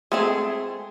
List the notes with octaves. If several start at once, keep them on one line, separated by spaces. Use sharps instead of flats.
G#3 A3 C4 G#4 A5